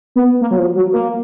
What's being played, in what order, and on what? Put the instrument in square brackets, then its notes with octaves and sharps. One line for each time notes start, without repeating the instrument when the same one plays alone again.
[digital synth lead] B3
A#3
F#3
F3
F#3
A#3